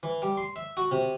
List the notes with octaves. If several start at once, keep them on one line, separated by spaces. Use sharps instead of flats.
E3
G3
C6
E5
F#4
C3